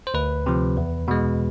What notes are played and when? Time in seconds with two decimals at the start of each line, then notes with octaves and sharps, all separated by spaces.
0.07 C5
0.14 D2 B4
0.46 C3 F3
0.77 E2
1.08 B2 G#3